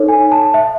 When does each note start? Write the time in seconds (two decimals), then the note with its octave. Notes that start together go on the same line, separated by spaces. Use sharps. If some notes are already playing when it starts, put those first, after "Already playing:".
Already playing: D#4 A4 C#5
0.09 G#5
0.32 A5
0.54 E5